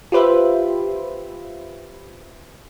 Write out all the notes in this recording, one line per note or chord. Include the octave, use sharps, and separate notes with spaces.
F4 G4 B4 C5 E5